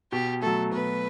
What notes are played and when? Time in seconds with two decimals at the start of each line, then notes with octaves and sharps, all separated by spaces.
0.12 B2 G4
0.42 F#3 A3 A4
0.72 B2 B4